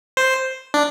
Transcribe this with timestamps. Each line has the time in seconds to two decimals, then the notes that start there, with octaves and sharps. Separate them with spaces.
0.17 C5
0.74 D4